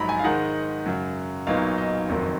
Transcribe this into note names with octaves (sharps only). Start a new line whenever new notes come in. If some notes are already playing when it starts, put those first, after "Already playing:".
Already playing: A#1 G#2 F#3 A#5 B5
G#5
F5
G#2 D#3 G#3 D#4 F#5
F#2 C#3 F#3
B1 A#2 F#3 B3 D#4 F5
D#5
F#1 F2 D#3 F#3